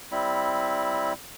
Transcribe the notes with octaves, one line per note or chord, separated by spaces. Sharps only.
G3 C4 E4 B5